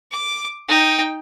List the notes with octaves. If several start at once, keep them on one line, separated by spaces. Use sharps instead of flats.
D6
D#4 G5